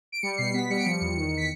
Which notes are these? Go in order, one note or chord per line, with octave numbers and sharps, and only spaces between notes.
D7
G3 C#7
B2 C7
B3 B6
G3 C#7
D7
F3 C#7
E2
D#3
B6